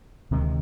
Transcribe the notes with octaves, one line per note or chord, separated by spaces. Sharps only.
D2 C3 D#3 G#3